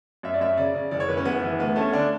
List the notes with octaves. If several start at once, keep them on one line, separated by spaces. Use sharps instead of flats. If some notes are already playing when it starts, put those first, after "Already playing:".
F#2 E5
D5
F#2 E5
C#3 D5
C#3
F#1 D5
C#5
F#1 B4
C#4
F#1 B3
E3 B3
D2 B3
A3 C#4
D3 D4